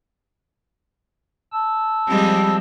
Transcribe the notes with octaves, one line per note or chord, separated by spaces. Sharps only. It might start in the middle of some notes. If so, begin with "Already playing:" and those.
A5 E6
F3 G3 G#3 C4